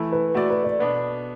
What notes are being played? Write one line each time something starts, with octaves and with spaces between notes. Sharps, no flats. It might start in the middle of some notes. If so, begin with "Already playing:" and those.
Already playing: E3 A3 E4
B4
A3 E4 F#4 A4 D5
B4
D5
B2 B3 D4